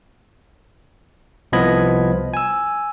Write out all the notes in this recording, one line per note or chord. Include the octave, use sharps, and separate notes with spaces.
C2 F3 B3 D#5 B5 G#6
G#5 E6